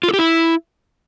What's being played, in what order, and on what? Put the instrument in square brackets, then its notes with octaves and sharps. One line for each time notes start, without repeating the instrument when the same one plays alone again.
[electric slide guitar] F4
A4
G4
E4